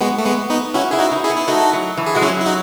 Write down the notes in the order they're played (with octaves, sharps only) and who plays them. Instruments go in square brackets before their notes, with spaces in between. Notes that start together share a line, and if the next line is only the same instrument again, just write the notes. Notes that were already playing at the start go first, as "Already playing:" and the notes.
[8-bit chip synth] G#3 B3 [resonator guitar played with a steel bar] F#4
[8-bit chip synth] A3
G#3 B3
B3 D#4
[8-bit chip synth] C#4 E4 [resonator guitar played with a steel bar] F#4
[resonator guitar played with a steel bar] E4 [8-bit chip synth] G#4
[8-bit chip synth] D#4 F#4
[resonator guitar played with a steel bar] D#4
[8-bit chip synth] E4 G#4
[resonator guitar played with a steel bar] B3
[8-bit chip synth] E4
[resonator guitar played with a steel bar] A3 [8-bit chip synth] D#4 F#4
[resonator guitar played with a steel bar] F#3
E3
[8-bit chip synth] G#4
[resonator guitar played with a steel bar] G#3 [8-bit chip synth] F#4
[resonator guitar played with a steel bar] F#3 [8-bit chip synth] C#4 E4
[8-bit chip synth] E4
D#4 F#4